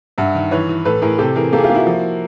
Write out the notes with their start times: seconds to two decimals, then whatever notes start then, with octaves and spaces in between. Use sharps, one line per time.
0.18 G2 E5 F#5
0.35 D#3
0.51 E3 B4 C#5
0.69 E3
0.85 A2 A4 B4
1.02 A2 G#4 A#4
1.18 C3 G4 A4
1.35 E3 G#4 A#4
1.52 A#3 G4 A4
1.58 G#4
1.64 F4 G4
1.69 A#3
1.75 E4 F#4
1.87 F3